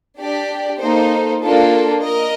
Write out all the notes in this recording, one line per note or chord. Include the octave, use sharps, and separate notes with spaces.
D4 G4 D5
A#3 D#4 A4 C5
A#3 D4 F4 A4
A#4 D#5